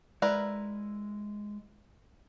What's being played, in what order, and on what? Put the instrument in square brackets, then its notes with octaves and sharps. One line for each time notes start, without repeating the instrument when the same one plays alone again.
[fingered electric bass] G#3 [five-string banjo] E4 A#4 B4 [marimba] D5